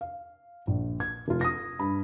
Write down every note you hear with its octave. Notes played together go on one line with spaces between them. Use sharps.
F5
A#1
G#6
F1 F4
D#6 A#6
G2 B5